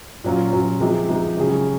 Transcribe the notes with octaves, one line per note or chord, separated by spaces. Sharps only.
A#2 F#3 C#4 F4
A#2 F#3 C#4 F4
C3 F3 G#3 D#4
C3 F3 G#3 D#4
C#3 F#3 C#4 G#4